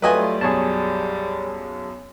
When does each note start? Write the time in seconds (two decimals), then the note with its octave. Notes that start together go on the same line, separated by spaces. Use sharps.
0.02 F#3 G3 A3 F4 B4 D#5 G#5
0.41 B1 F#2 G#4 C#5 A5